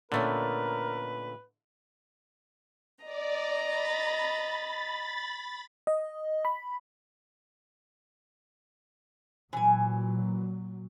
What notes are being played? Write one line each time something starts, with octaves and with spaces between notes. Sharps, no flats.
A#2 D3 A3 B3 C#4 A#4 B4
D5 D#5 A#5
B5 A6
D#5
B5
A#2 E3 F#3 G#5